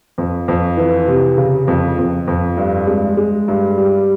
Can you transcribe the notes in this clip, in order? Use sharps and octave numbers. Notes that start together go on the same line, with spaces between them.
F2
F2
E3
C3
C#3
F2
F2
F2
G2
G#3
G#3
G2
G3